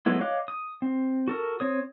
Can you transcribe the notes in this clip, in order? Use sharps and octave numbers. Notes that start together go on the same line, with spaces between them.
F#3 G#3 A3 B3 E4
C#5 D#5 F5 D6 F#6
D#6
C4
F#4 A4 A#4
C4 C#5 D#6